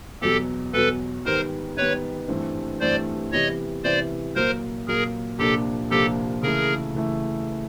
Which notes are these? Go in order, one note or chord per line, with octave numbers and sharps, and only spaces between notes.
E2 B2 F#3 G4 A4
E2 B2 F#3 A4 B4
G#2 D#3 G3 B3 A#4 C5
G#2 D#3 G3 B3 B4 C#5
G2 E3 A3 C4
G2 E3 A3 C4 C5 D5
C3 E3 G3 B3 E4 C#5 D#5
C3 E3 G3 B3 E4 C5 D5
A#2 F#3 A#3 A#4 C5
A#2 F#3 A#3 G#4 A#4
C2 A#2 F3 A#3 D4 G4 A4
C2 A#2 F3 A#3 D4 G4 A4
C#3 E3 A3 G#4 A#4
C#3 E3 A3